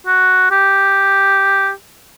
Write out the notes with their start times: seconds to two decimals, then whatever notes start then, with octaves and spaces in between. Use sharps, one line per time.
0.07 F#4
0.51 G4